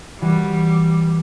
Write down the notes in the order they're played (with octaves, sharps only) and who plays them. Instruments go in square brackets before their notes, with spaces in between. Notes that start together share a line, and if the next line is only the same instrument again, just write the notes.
[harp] E3 F#4 [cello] G3